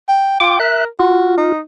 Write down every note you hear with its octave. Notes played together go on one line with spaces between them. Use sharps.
G5
F4 G5 D6
A#4 E5 F#6
F4 F#4
D#4